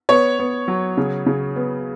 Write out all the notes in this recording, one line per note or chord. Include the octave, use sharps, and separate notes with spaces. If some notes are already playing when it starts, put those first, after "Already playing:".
B3 C#5
B3
F#3
C#3
C#3
B3